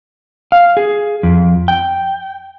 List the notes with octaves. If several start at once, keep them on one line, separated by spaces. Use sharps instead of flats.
F5
G#4
F2
G5